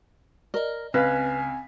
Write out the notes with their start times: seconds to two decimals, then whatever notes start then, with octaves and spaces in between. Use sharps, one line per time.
0.54 A#4 D5 D#5
0.94 C#2 C4 B4 F5 G#5 B6